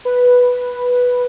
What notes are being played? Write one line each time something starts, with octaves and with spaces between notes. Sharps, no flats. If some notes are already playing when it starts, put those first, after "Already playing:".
B4